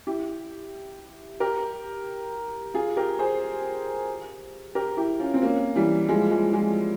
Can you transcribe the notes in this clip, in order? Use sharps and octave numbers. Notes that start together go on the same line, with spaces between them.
E4 G4
G4 A#4
F4 G#4
G4 A#4
G#4 C5
G4 A#4
E4 G4
C#4 F4
C4
A#3 C#4
E3 G3
F3 G#3
F3 G#3
F3 G#3